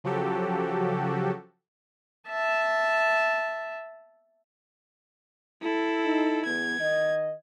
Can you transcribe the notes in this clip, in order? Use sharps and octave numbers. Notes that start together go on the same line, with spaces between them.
C#3 F3 F#3 F#4 G4 A4
E5 A5
E4 A4
D#4
E2 B3 G#6
D#3 D#5